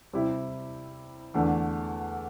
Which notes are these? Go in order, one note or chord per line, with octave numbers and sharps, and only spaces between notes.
C3 G3 C4 E4 G4
E2 D3 A3 D4